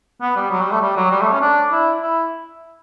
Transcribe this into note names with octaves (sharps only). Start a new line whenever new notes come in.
B3
G3
F#3
G3
A3
G3
F#3
G3
A3
C#4
D4
E4
E4